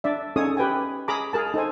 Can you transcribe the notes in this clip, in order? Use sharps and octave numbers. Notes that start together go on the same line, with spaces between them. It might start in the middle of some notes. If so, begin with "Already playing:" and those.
D4 D5 E5
C#4 D#4 G#4 A4 C#5 D#6
G4 B4 G5 G#5
G#4 A#5 B5 D6
G#4 A#4 A5
D#4 A4 C5 G#5